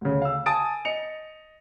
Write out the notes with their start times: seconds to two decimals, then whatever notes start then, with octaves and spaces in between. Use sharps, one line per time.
0.01 D2 C#3
0.22 F5 E6
0.46 G#5 A5 D#6 A6 D7
0.85 D#5 C#7 F7